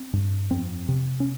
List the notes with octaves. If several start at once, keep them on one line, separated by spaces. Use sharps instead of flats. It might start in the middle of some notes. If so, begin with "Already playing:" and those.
Already playing: C4
G2
F2 C4
C3
C#4